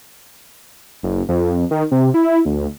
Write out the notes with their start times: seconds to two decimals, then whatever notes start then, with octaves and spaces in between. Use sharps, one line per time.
1.03 F#1
1.29 F2
1.71 D#3
1.91 C3
2.14 E4
2.45 D2